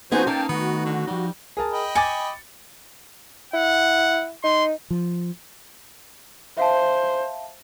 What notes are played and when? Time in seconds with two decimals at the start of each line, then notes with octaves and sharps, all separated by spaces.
0.12 F3 B3 C#4 D#4 F#4 G#4 C5 G#5
0.27 A#3 D#4 G5 A5
0.49 D#3 A3 B3 F#4
0.86 D3
1.07 F3 G3 D#4
1.57 G#4 A#4 A5
1.72 D#5 G5 B5
1.95 G#5 D6 A6 C#7
3.53 E4 F#5
4.44 D#4 C6
4.90 F3
6.57 C5 E5 F5 A5